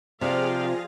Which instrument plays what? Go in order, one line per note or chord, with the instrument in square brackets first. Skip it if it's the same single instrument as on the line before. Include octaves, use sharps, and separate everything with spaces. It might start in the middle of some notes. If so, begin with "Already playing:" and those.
[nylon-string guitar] C3 [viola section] F3 F5 [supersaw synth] F4 G#4 A#6 [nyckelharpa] D5 G5